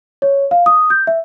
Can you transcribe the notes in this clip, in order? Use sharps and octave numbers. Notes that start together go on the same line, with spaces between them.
C#5
F5
D#6
G6
E5